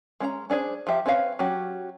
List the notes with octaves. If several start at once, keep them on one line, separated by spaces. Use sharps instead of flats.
G#3 C#4 C5 A#5
C#4 D4 G#4 C5
F3 F4 G4 E5
C4 C#4 B4 C#5 F5
F#3 C#4 F#4 G4